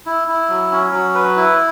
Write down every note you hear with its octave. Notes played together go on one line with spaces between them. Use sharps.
E4
E4
F#3
C#4
F#3
B4
E4